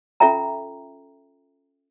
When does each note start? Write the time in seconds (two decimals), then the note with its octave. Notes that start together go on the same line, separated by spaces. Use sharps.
0.20 C#4 F4 A4 E5 G5 A#5